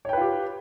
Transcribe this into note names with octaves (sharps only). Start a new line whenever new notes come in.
F4 G4 B4 C#5 G5